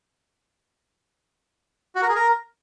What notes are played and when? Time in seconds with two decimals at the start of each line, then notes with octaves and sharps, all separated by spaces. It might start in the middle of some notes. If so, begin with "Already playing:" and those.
1.95 F#4
2.02 A#4
2.09 G#4
2.16 A#4